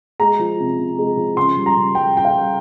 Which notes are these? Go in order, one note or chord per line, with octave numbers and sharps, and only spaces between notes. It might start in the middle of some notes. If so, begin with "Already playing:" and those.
G#3 A#5
F3
C3
C3
G#3
F3
C#3 C6
G3
A#5
C#3
G3 G5
C#3 G5
F5
G3